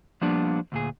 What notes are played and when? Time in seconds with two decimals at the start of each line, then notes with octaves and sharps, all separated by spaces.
0.21 F3 G3 A#3 B3 D4
0.72 D2 A#2 G#4